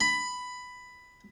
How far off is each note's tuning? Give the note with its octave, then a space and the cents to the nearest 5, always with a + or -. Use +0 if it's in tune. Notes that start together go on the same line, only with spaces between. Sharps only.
B5 +10